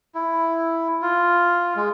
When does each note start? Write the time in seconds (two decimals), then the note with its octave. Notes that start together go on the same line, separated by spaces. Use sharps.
0.15 E4
1.02 F4
1.76 G#3